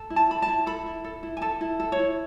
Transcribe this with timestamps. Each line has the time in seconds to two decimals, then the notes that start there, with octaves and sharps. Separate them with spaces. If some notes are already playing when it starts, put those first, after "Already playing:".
Already playing: A4
0.10 E4
0.16 A5
0.30 A4 B5
0.42 A5
0.48 E4
0.66 A4 B5
0.86 E4
1.04 A4
1.23 E4
1.37 G#5
1.42 A4 A5
1.61 E4
1.80 A4
1.92 C#5
1.99 E4